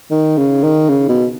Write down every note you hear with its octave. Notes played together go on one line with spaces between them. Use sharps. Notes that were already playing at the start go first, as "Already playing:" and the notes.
D#3
C#3
D#3
C#3
B2